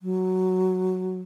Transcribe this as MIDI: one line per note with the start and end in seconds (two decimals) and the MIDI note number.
0.02 1.21 54